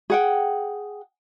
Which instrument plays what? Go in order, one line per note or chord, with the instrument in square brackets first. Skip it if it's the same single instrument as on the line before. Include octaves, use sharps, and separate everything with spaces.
[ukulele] G#4 F#5 G5